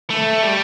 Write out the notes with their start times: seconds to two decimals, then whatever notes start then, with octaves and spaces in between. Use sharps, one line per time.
0.10 A3
0.43 G3